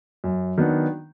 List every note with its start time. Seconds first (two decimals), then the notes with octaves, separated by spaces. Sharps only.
0.24 F#2
0.58 D#3 F#3 B3 D4